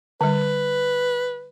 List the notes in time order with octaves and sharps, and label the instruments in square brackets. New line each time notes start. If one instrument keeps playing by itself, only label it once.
[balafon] D3 G3 [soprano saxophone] B4